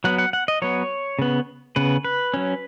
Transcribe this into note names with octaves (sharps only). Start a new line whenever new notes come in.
F#3 B3 F#5
F#5
F#5
D#5
F#3 B3 C#5
C#3 B3
C#3 B3 B4
B4
F#3 C#4